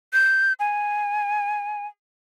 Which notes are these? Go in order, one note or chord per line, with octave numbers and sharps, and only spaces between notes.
G6
G#5